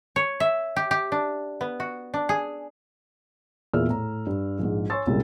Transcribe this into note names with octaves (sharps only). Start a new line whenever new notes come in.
C#5
E5
G4
G4
D4
B3
F#4
D4
G#4
E2 A#2 G#4 E5 E6 F6
A2 A#5
G2
A#1 G#2
C#5 G#5 C6 C#6 E6 A6
C2 F#2 A#2 G#3